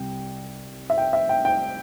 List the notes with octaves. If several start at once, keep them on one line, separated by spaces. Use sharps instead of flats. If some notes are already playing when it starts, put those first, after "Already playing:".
Already playing: C2 C3 G3 G5
E5
G5
E5
G5
G5